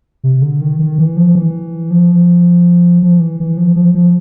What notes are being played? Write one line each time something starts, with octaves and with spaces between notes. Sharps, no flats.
C3
D3
D#3
D#3
E3
F3
E3
F3
F3
E3
E3
F3
F3
F3